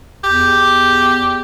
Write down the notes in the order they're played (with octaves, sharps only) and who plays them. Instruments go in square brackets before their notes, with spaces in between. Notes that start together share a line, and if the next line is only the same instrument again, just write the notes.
[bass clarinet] E2 [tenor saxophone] G4